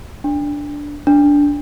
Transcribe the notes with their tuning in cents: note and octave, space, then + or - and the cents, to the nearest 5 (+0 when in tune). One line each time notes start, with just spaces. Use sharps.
D4 -5
D4 -15